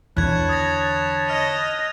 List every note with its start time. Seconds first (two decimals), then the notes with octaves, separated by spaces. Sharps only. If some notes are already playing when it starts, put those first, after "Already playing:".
0.17 E2 D3 C#5 A5 B5 F#6 G#6
0.49 D#6 A6 A#6
1.29 D#5 F6 F7